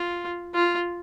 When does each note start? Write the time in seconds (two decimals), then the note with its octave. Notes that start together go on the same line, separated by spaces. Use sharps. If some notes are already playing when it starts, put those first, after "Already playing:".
Already playing: F4
0.55 F4